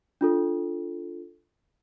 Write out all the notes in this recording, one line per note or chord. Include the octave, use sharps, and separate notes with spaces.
D4 F4 A4